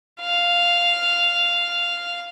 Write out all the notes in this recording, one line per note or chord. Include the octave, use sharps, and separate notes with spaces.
F5